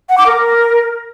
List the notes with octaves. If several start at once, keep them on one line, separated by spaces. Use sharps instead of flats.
F#5
D6
A#4